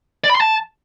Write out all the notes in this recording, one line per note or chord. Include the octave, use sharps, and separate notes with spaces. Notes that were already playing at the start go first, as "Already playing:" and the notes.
D5
B5
C6
A5